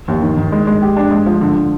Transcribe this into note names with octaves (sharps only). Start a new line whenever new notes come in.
D#2
D#3
D#3
G#3
G#3
G4
D4
G#3
F3
D3
D3